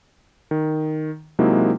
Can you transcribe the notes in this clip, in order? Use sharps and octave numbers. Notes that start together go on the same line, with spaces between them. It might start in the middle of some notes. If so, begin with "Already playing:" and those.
D#3
C3 F#3 G#3 A#3 D#4 E4